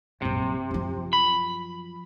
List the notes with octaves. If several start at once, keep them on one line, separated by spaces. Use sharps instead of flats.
A#1 F#2 C3
F#2 F3
B5